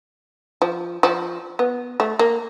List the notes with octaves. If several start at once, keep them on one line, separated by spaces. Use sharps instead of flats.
F3
F3
B3
A3
A#3